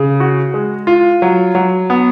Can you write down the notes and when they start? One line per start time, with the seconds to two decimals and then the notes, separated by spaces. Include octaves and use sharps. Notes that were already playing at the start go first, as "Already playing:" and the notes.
Already playing: C#3
0.20 F#4
0.54 G#3
0.87 F4
1.22 F#3
1.55 F#3
1.90 B3